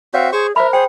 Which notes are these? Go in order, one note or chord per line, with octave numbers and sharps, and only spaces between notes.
C4 F#4 C#5 E5 F5
G#4 C5 C#6
A#4 C5 E5 B5
G#4 C5 G5